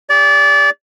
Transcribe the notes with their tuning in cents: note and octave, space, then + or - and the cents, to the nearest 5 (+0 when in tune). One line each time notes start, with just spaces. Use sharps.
G4 +40 D5 -25